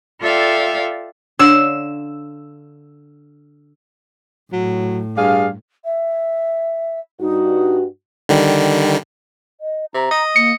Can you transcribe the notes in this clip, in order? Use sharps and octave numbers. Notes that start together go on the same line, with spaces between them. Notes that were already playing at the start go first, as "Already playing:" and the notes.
F4 A4 D5 E5 F5 G5
D3 C#5 F5 E6
A2 F#3
G2 G#4 D5 F5
E5
G2 D#4 F#4
D3 D#3 G3
D#5
C3 A#5
D#5
A#3 C#7